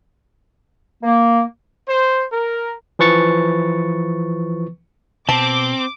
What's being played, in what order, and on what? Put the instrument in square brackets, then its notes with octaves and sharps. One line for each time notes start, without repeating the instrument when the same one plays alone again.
[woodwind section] A#3
[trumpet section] C5
A#4
[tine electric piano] E3 F3 B4 C#6 A6 C#7
[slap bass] B2 [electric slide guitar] C4 [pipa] A5 [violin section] D6